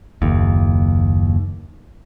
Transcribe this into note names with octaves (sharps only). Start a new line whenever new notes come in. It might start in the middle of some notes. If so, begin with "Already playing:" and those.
F#1 D#2